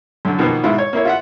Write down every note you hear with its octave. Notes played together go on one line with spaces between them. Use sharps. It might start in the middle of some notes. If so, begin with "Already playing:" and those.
F#2 D3
B2 D#3 F3 A#3 B3
G#2 B2 E4 F4
C#5
A#3 E4 C#5
F4 E5 F#5